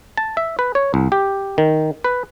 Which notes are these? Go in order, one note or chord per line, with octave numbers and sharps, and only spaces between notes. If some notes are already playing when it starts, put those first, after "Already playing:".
A5
E5
B4
C#5
C2
G4
D#3
B4